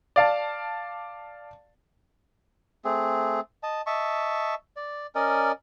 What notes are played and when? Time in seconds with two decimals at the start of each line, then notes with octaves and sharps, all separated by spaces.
0.16 D5 F5 A5
2.85 A3 C4 G#4
3.63 D#5 A5
3.86 D#5 E5 A5 C#6
4.76 D5
5.15 C#4 A#4 D5 D#5